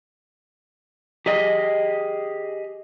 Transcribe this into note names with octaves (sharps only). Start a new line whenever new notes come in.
G4 G#4 D#5